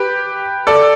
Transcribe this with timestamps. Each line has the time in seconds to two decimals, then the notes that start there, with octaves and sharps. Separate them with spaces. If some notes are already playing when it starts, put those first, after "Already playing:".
Already playing: G4 B4
0.67 A4 D5